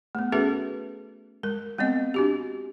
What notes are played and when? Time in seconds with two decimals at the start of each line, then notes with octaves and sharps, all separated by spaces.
0.15 A3 B3
0.32 C#4 F#4 G#4 A4 B4 E5
1.43 G#3 A#4
1.78 G#3 B3 C4 D#5
2.14 D4 F#4 G4